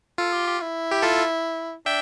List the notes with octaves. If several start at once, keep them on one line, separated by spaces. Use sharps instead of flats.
F4 A4
G4
G4
E4
G4
F4 A4
D4 E5 G5